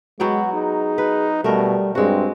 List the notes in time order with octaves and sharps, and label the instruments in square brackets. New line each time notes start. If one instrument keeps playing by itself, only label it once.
[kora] F#3 B3 G5 [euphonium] G#3 [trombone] F#4
[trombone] D#4 [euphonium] G#4
[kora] B4
[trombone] B2 [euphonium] G3 [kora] A3 A#4
[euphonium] G2 [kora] G#3 F#4 [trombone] C4